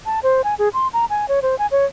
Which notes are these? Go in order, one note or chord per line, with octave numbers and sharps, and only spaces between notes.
A5
C5
G#5
G#4
C6
A#5
G#5
C#5
C5
G#5
C#5